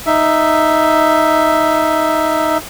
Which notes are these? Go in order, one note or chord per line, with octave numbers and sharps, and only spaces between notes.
D#4 E5